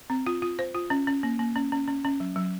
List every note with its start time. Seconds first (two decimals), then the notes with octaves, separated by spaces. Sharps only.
0.10 C4
0.27 F4
0.42 F4
0.59 C5
0.75 F4
0.90 C#4
1.07 C#4
1.23 A#3
1.39 A#3
1.56 C#4
1.72 C#4
1.88 C#4
2.05 C#4
2.20 F#3
2.36 F#3